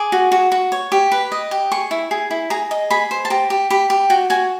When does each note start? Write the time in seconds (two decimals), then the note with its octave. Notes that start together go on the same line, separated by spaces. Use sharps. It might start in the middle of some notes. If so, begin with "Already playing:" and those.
Already playing: G#4 D6
0.12 F#4
0.32 F#4
0.52 F#4
0.72 C#5
0.92 G4
1.12 B4
1.32 D#5
1.51 G4
1.72 G#4 C#6
1.91 E4
2.11 G#4
2.31 E4
2.50 G#4 A#5
2.71 D#5
2.90 G#4 B5
3.11 C5
3.25 A5
3.30 G4 A#5
3.50 G4
3.70 G4 B5
3.90 G4
4.10 F#4 G5
4.30 F#4 G#5